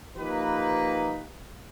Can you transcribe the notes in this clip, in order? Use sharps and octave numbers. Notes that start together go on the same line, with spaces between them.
F3 A#3 D#4 G4 B4